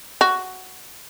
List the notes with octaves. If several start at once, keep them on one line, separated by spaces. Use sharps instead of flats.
F#4